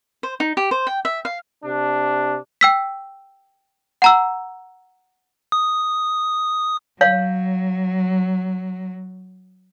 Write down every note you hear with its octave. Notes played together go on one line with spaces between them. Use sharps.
C5
D#4
G4
C5
G5
E5
F5
C3 D4
G5 E6 B6
F#5 A#5 E6
D#6
F#3 C#5 F5